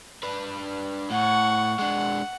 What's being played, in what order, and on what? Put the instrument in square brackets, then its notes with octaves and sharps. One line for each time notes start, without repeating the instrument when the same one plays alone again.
[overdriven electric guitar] D4 B4
[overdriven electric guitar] A2 [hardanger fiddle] F#5 C#6
[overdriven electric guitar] G#3 D4 [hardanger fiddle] F#5